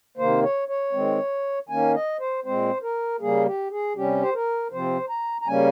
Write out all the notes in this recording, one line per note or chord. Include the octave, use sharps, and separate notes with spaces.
C3 D#3 A#3 C5
C#5
C#5
D#3 G#3 C4
D#3 A#3 C#4 G#5
D#5
C5
A#2 G#3 C4 C5
A#4
C#3 G3 A#3 G#4
G4
G#4
C3 G3 C#4 G4
C5
A#4
C3 F3 C4 C5
A#5
A#5
C#3 G3 A#3 C#4 G#5